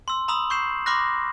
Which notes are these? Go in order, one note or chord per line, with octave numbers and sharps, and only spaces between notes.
C6 E6
A#5 B5 D#6 E6 F#7
C#6 G6 C7 E7
B5 C6 D6 F6 F#6 A#6